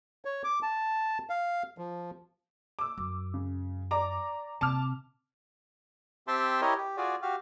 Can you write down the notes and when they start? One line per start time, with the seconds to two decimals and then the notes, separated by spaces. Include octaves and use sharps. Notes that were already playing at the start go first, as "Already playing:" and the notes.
0.25 C#5
0.44 D6
0.63 A5
1.30 F5
1.78 F3
2.79 D6 E6
2.98 F#2
3.34 C#3
3.91 D5 A#5 D6
4.61 C3 A5 D6 F6
6.27 C4 G4 E5 G5 A5 C6
6.61 E4 G4 A#4 C#5 D#5
6.78 G4
6.97 F4 F#4 G#4 D5
7.22 F#4 G4 F5